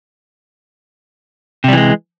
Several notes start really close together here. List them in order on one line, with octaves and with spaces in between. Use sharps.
C3 G3 E3 G#3